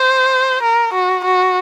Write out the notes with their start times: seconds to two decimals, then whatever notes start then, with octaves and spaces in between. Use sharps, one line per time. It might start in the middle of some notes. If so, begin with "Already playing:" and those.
Already playing: C5
0.63 A#4
0.93 F#4
1.24 F#4